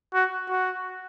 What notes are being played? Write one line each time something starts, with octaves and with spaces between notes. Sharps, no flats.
F#4
F#4